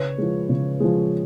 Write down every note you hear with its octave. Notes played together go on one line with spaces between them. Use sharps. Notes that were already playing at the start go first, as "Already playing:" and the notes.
Already playing: C#3 B4 C#5
F3 G#3
C#3
F3 G#3